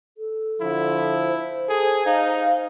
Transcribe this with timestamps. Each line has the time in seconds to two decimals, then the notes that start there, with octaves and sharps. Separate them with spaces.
0.18 A4
0.61 D3 F3 E4
1.28 C5
1.69 G#4 A4
2.06 D#4 F5